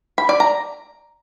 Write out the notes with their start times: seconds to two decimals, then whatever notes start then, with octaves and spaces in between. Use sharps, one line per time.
0.18 B5
0.29 D5
0.40 A#5